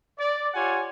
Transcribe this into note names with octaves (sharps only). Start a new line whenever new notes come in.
D5
F4 G4 C#5 F#5 G#5